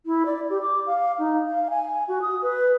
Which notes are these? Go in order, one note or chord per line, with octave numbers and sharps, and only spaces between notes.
E4
D5
G4
D6
F5
D#4
F5
G#5
F#4
D#6
B4